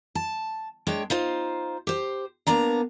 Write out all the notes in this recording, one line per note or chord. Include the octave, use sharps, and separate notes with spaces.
A5
G#3 D4 C#5 G5
D#4 F4 C5
G4 C5
A#3 B3 D4 A#5